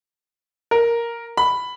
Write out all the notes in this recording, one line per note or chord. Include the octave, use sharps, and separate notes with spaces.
A#4
B5